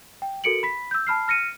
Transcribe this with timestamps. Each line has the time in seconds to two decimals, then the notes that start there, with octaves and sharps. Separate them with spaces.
0.22 G5
0.44 F#4 A4 A#4 C#7 D7 F#7
0.63 B5 B6
0.91 E6 G6
1.07 A5 B5 F6 C7
1.28 F6 A#6 C#7 D#7